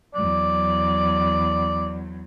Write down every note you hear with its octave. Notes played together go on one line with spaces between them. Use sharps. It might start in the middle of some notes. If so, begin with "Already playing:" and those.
E2 F#3 D5